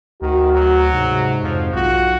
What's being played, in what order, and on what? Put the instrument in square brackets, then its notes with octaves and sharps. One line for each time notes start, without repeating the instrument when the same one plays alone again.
[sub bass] D2 [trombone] D#3 [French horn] F#4
[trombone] F#3
[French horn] G#2 [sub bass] C3
[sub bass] F2 [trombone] F3
[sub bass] B1 [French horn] F4 [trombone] F#4